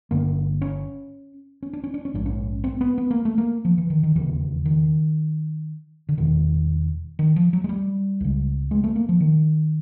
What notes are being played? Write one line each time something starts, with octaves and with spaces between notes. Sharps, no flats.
G1 G2 D3 A#3
C#4
C#4
D4
C#4
D4
C#4
A#1 G#2 D4
C#4
C4
B3
B3
A#3
A3
A#3
F3
E3
D#3
D#3
E1 D#2 C#3 E3
D#3
D3
E1 E2 B2 D#3
D#3
F3
F#3
G#3
G3
C#2 C#3
G#3
A3
A#3
F3
D#3